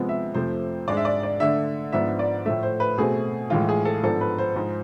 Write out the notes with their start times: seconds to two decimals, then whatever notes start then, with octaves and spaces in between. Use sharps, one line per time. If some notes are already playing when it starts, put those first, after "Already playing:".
Already playing: C3 F3 G#3 B3
0.09 E5
0.34 F2 C3 F3 A3 C5
0.87 G#2 G#3 D4 D5
0.97 E5
1.05 D5
1.23 D5
1.40 D3 A3 D4 E5
1.92 G#2 F3 B3 D4 E5
2.19 D5
2.46 A2 F3 A3 E5
2.63 C5
2.80 B4
2.97 B2 A3 C4 G#4
3.50 A2 E3 G#3 F4
3.69 G#4
3.85 A4
4.03 G#2 F3 B3 D4 A4
4.21 B4
4.38 C5
4.56 G#2 F3 G#3